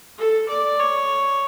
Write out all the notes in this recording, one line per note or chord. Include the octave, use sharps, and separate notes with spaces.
A4
D5
C#5